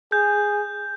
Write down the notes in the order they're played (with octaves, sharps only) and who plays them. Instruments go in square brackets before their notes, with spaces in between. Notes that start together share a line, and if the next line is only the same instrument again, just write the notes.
[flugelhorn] G#4 [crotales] G6